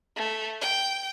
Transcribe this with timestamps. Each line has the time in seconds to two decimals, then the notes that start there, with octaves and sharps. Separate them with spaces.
0.16 A3
0.61 G5